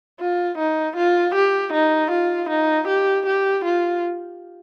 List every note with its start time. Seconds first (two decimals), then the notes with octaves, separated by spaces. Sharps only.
0.20 F4
0.58 D#4
0.97 F4
1.35 G4
1.73 D#4
2.11 F4
2.50 D#4
2.88 G4
3.26 G4
3.65 F4